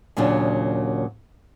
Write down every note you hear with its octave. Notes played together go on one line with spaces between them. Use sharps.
D#2 A#2 C#3 F#3 D4